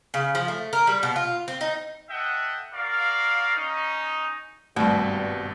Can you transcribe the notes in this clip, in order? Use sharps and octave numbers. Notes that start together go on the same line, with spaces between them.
C#3
F3
A3
A#4
G3
B2
F4
C4
D#4
A4 D#5 E5 F#5 G5
F#4 A#4 D5 F5
C#4 D#4
G#1 G2 B2 G3 A3